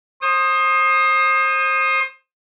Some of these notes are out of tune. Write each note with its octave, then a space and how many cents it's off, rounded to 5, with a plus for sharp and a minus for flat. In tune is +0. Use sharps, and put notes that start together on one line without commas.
C5 +30 D#6 -5